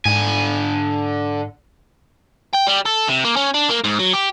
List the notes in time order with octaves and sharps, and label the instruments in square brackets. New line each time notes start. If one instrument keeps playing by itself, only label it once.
[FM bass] G#2 [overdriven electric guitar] D3 G#5
[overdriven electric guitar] G5
G3
A4
C3
A#3
C#4
D4
A#3
G#2
F#3
G4